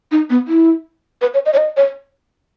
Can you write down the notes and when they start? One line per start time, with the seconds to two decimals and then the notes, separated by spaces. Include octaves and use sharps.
0.11 D#4
0.30 B3
0.48 E4
1.22 B4
1.34 C#5
1.46 D#5
1.53 C#5
1.57 D#5
1.77 C#5